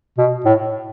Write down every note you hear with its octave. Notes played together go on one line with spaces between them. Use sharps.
B2
A2